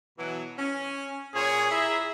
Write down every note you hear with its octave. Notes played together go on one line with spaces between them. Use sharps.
B2 E3 F#3
C#4
A#2 G#4 C#5
E4 G#4 E5 A#5